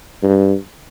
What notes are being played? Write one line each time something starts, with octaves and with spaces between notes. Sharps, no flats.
G2